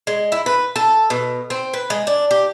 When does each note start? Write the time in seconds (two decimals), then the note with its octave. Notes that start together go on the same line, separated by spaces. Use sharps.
0.07 G#3
0.32 E4
0.46 B4
0.76 A4
1.10 B2
1.50 C4
1.73 B4
1.90 G#3
2.07 D4
2.31 G4